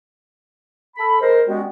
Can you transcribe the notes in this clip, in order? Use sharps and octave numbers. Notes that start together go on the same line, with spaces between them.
A4 B5
G#3 A#4 C5
G3 G#3 B3 C#4 F#4